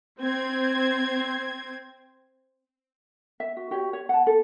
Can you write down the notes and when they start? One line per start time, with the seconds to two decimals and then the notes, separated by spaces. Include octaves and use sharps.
0.20 C4 G#6
3.40 E5
3.57 F#4
3.71 F#4 G4 C#5 E5
3.93 C#5
4.09 F#5 A5
4.27 A4